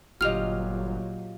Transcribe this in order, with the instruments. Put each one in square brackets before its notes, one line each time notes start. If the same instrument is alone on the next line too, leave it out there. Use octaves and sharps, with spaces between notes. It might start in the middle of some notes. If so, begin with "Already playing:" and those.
[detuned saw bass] G1 [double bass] A#2 F#3 [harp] F4 G4 D#5 [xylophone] F6 F7